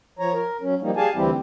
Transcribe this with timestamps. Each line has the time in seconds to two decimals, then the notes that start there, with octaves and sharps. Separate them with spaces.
0.19 F3 C#5 A#5
0.33 A#4
0.61 F#3 C#4
0.82 F3 G3 A#3 D#4
0.97 G4 G#4 D5 F5 G#5 A5
1.15 D2 E3 G3 C4 E4 G4